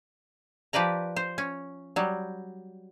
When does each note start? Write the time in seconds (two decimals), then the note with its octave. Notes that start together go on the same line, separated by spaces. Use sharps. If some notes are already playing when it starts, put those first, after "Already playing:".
0.73 F3 G4 B4 D5 A#5
1.16 C5
1.38 C#4
1.96 F#3 G3